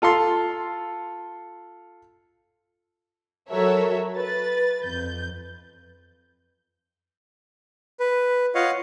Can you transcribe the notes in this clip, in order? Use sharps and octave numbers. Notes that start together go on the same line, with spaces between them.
F4 A4 F5 C6
F#3 F#4 A4 A#4 C#5 E5
B4 A6
F2 G6
B4
F4 C#5 D#5 F5 F#5